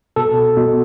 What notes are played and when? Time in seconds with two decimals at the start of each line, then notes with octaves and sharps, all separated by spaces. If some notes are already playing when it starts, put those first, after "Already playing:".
0.16 B2 A4
0.57 B2